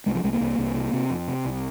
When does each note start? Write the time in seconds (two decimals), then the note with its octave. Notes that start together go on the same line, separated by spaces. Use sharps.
0.06 C2 G#3
0.15 F3
0.24 C2 G#3
0.33 A#3
0.41 C2
0.59 C2
0.75 C3
0.93 C3
1.10 F2
1.28 C3
1.45 C2